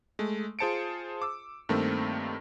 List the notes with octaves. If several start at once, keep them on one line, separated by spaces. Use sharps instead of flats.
G#3 A3
F4 G#4 C5 A5 C#7 D7
D6 E6
G2 D#3 A3 A#3 C4